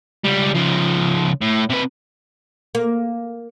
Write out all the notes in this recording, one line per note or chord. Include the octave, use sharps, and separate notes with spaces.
C#2 G3
C#3 F3
A2
C3 B4
A#3